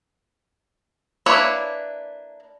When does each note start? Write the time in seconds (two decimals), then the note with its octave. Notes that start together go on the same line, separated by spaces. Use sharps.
1.26 A#3 D4 E4 B4 C#5